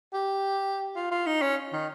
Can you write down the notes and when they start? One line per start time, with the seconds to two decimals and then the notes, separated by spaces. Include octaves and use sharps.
0.13 G4
0.96 F4
1.11 F4
1.26 D#4
1.42 C#4
1.73 D#3